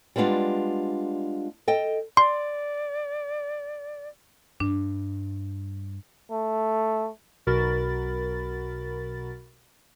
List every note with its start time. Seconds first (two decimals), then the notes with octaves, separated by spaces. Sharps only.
0.16 G3 G#3 B3 D4 F4
1.67 A4 D#5 G5
2.17 D5 C6
4.60 G2 D4
6.31 A3
7.47 B1 B2 F#4 A#4 B5 A6